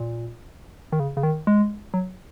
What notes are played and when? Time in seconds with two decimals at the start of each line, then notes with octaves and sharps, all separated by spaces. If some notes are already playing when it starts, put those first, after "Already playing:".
Already playing: A#2
0.92 D#3
1.00 C#3
1.17 C#3
1.23 D#3
1.47 G#3
1.94 F#3